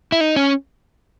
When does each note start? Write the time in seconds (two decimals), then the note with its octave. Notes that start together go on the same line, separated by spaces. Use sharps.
0.12 E4
0.21 D#4
0.36 C#4